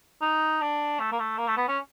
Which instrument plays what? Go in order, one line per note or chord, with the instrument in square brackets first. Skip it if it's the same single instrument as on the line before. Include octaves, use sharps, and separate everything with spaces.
[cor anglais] D#4
D4
A3
A#3
A3
A#3
A3
B3
C#4